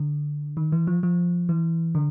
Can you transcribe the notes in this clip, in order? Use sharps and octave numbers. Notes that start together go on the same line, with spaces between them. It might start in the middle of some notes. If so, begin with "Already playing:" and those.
Already playing: D3
D#3
E3
F3
F3
E3
D3